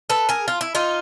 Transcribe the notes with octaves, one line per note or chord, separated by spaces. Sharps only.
A4 B4
G#4 A#4
F4
E4
D#4 F4